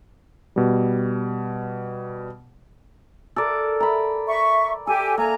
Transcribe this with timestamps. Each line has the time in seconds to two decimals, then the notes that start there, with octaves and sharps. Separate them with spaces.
0.56 B2 G3
3.36 A4 A#4 D5
3.80 A#5 B5
4.29 E5 C#6
4.87 G4 A4 G#5
5.18 A#3 G#5 A#5